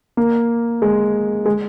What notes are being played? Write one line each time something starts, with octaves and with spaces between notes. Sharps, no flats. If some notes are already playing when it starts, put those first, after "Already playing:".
A#3
G#3
G#3